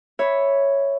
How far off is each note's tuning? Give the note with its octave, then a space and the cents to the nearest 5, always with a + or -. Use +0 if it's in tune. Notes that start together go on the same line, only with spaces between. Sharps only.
C#5 +0 E5 +0 B5 +0